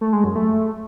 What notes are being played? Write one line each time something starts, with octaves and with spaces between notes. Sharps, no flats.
A3
G#3
F#2
A3